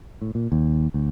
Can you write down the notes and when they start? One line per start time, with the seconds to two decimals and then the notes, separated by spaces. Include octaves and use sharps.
0.22 A2
0.35 A#2
0.52 D#2
0.94 D2